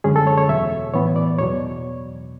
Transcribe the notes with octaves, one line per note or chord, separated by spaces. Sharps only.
F#2 D3 G#3 C#4 G#4
A4
C#5
C#5
E2 B2 F#3 E5
A2 E3 B3 C#5
D5
E2 B2 F#3 C#5